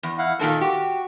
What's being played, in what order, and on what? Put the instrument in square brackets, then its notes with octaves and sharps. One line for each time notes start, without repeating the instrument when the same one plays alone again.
[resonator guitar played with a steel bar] E2
[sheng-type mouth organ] E4 F5 F#5
[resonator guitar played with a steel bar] A#2 D#3 A#3 [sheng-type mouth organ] A4
[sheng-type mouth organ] F#4 [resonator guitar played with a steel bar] G4